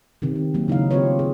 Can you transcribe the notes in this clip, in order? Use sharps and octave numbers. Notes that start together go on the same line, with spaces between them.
C3 D#3 C4
C4
F#3 A#3
C#3 D#4 E4 F5
A3 C4 F4 G4 B4 C#5
G#4